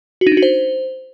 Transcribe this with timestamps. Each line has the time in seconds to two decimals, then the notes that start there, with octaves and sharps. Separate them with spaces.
0.21 F#4
0.27 D#4
0.32 D4
0.37 F#4
0.42 C5